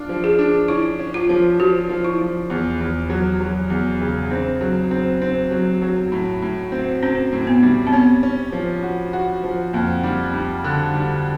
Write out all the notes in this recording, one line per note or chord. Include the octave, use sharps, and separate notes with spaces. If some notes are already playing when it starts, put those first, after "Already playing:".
Already playing: D4 F4
F3
G#4
D4
C#4 E4
C#4
F4
F3
F3 F#4
F3
E4
F3
E2
E2
F#3
F#3
E2
C#3
C4 D4
F#3
C4
C4
F#3
F#3
A2
A2
C4
C4 C#4
A2
B3
G3
C4
B3 C#4
C#4
F3
F#4
F#4
F3
F2 A#3
G3
G3
D3
G3